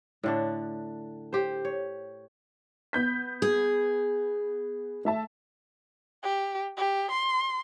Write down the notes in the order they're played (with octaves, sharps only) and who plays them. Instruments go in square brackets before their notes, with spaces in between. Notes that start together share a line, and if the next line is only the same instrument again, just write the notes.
[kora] A2 D3 D4
G4 C5
C#5
[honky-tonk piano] B3 G6 B6
[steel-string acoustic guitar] G#4
[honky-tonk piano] A3 E5 A5
[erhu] G4
G4
C6